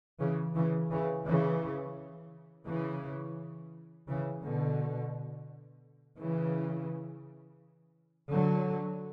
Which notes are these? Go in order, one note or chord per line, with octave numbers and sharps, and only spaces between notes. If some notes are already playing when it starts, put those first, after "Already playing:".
C#3 E3
C#3 E3
C#3 E3
C#3 E3
C#3 E3
C#3 E3
B2 D3
C#3 E3
D3 F#3